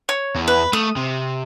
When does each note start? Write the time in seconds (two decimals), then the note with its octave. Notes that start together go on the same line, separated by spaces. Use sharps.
0.09 C#5
0.35 E2
0.48 B4
0.73 A3 D#6
0.97 C3